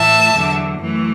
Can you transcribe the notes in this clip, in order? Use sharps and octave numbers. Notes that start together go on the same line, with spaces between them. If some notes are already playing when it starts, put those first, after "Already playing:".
Already playing: A2 E3 A3 E5 A5
E2 D3 F#3
F#2 E3 A3